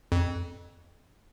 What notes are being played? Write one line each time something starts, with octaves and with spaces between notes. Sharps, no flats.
F2